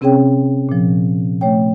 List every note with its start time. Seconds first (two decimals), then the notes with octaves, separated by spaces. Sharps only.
0.01 C3 C4 C#4 G#4 C#5 G5
0.69 A#2 F3
1.41 A3 C#5 G5